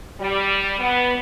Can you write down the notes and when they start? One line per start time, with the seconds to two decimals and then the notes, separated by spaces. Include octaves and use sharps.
0.20 G3
0.79 B3